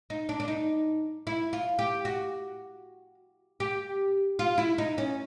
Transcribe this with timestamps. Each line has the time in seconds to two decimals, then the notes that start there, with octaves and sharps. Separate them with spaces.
0.10 D#4
0.29 D4
0.40 D4
0.48 D#4
1.27 E4
1.53 F4
1.79 G4
2.05 F#4
3.60 G4
4.39 F4
4.58 E4
4.78 D#4
4.98 C#4